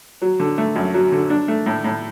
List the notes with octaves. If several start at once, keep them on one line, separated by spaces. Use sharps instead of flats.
F#3
D3
A3
F#2
F#3
D3
D4
A3
A2
A2